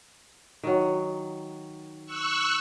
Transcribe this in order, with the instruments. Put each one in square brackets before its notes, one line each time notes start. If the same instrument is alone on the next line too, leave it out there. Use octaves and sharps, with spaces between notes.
[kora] D#3 F#3
[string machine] C#6 E6 F#6